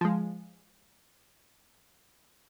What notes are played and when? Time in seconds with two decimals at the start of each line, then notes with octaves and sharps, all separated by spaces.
0.01 F3 G#3